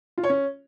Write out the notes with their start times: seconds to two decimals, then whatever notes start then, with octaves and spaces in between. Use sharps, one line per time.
0.18 F4
0.23 C#5
0.29 C#4